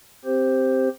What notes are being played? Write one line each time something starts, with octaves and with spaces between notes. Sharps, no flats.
C4 G4 C5